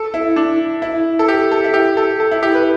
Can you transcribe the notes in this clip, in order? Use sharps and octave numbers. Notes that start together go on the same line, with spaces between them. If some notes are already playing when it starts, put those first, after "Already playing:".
Already playing: A4
E4
D4
E4
A4
G4
A4
E4
G4
A4
A4
E4
G4
B4